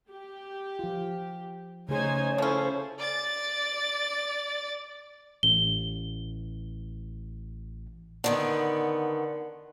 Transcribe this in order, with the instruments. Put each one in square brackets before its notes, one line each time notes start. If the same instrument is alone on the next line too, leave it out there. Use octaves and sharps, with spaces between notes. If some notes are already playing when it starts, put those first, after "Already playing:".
[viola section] G4
[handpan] F3 F4
[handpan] C#3 A3 G#4 [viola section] D#4 C5 G#5 [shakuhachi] C#5
[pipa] F3 C#4 [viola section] E4 A4 C5
[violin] D5 A6
[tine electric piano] A1 [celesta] G7
[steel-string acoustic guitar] D3 D#3 B3